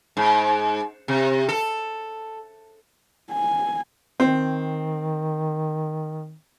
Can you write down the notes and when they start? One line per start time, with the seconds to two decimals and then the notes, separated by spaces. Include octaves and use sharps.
0.17 G#2
1.08 C3
1.49 A4
3.32 G#5
4.20 D#3 C4